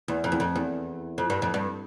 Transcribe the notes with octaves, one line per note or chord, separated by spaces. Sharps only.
E2
F2
E2
F2
E2
F2
G2
F2
G2